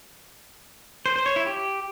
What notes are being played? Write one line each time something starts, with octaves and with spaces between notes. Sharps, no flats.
C5
C5
C#5
E4
G4